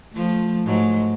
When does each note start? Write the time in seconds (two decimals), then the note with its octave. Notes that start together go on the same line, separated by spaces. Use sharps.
0.12 F3 A3
0.65 G#2 F#3 A3